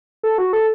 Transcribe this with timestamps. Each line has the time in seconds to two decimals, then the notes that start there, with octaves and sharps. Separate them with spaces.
0.23 A4
0.38 F#4
0.53 A4